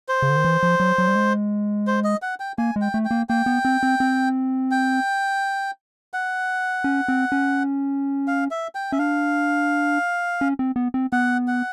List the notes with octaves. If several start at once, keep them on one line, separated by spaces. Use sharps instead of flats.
C5
C#3
D3
D#3
E3
F3
F#3
F#3
G3
G#3
C5
D#5
F#5
G5
A#3 G#5
G#3
G5
A3
G5
A#3
A#3 G5
B3
C4
C4
C4
G5
F#5
C#4
C4
C#4
F5
E5
G5
C#4 E5
D4 F5
C#4
C4
B3
C4
B3 F#5
F#5